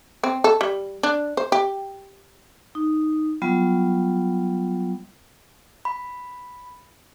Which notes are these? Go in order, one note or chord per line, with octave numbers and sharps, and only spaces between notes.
C4
A4
G3
D4
C5
G4
D#4
F#3 G3 B3 F4
B5